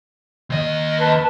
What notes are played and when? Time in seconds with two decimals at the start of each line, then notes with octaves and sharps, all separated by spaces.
0.50 D#2 D#5
0.98 B4 A5